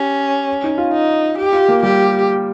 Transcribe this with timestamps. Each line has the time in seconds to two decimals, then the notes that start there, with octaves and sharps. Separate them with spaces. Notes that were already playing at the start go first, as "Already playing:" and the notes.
Already playing: C#4 G4
0.64 D#4
0.78 F4
0.93 D#4
1.38 G4
1.53 F4
1.68 A#3
1.83 G3 G4